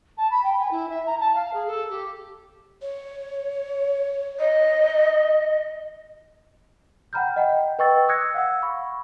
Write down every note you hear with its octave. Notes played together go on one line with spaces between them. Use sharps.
A5
B5
G5
G#5
E4
E5
A#5
A5
F5
G#4
A4
G4
C#5
D#5
F#5 G5 A#5 B5 F6 G6
D#5 F#5 G5
B4 D#5 G5 C#6 E6 A6
D#6 E6 F#6 G#6 A#6 C#7
F5 F#5 E6
B5 C#6